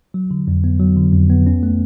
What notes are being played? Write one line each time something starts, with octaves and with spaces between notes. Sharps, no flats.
F#3
D3
F2
B3
F#3
D3
F2
B3
C#4
A3